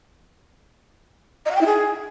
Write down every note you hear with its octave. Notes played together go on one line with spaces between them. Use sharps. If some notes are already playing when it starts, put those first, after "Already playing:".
D#5
F#5
G5
E4
G#4